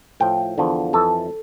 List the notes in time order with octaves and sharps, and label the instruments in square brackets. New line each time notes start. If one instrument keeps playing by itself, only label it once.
[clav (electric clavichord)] A2 F3 G5
E2 D3 F3
F2 E3 A4